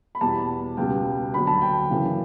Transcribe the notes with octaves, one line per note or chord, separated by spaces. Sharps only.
B5
E2 B2 G3 A5
C#2 B2 G3 G5
D2 D3 F#3 B5
A5
G5
F#2 C#3 E3